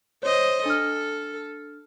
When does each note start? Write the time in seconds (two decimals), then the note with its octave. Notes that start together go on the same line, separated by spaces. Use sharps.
0.23 C5 C#5 D#5
0.65 D4 A4 F6